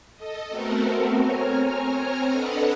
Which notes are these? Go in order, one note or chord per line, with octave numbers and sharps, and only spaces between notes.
A4 D#5
A3 B3 C4 F#4 A4 A#4
C4 C#5 G#5 A#5 F6
D4 A4 B4 D#5 F#5